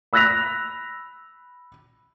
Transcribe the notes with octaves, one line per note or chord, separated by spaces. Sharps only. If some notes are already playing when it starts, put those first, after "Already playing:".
B5 E6 F#6 A#6 B6 F7